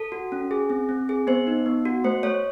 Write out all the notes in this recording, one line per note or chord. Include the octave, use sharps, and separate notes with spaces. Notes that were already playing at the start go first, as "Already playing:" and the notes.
Already playing: A4
F#4
C#4
G#4
C4
C4
G#4
B3 C5
D#4
B3
F#4
A3 C5
A3 C#5